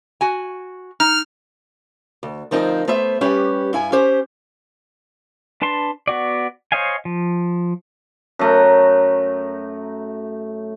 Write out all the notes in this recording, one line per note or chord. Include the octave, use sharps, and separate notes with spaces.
F#4 G#5
D#4 F6
D2
D2 F3 C4 D#4 A#4
A3 B3 C5 E5
G3 C#4 G4 B4
G2 E4 G#5
C#4 G4 C5
D4 B4 A5 C6
B3 F#4 D5
C5 C#5 D#5 F5 G#5
F3
F#2 A3 A#5